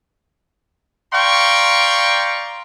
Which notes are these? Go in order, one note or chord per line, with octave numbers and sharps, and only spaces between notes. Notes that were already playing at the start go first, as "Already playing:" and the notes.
D5 F5 G5 A#5 C6 C#6